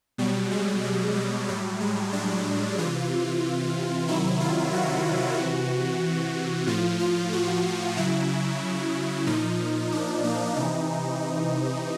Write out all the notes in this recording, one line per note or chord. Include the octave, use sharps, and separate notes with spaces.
B2 F#3 G3
G#3
G#3
G3
A2 F#3 G3
G#3
D4
C3 E3 F4
C3 D#3 F#3 E4
F4
F#4
C3 E3
A2 F3 F4
F4
F#4
C#3 F#3 E4
A#2 F3 D#4
D4
A#3
C3 E3 D#4